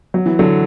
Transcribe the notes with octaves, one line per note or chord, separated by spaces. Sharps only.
F#3
E3
D3 F#3